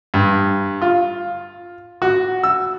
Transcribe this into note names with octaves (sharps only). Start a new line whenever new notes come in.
G2
F4
F#4
E6